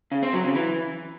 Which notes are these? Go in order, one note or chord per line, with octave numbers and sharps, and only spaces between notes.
C#3
C4
F#3
C#3
E3